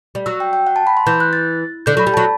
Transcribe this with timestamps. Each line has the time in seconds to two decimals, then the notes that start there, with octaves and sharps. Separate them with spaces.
0.15 G3
0.26 F#3 E6
0.40 G5
0.53 G5
0.67 F#5
0.76 A5
0.87 B5
0.97 C6
1.06 E3 G6
1.20 F#6
1.33 A6
1.86 D3 G6
1.97 F#3
1.99 B5
2.07 G3
2.14 F#3 A5